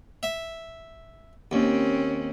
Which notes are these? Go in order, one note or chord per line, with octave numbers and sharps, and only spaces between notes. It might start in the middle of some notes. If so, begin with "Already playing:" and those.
E5
D#2 C4 C#4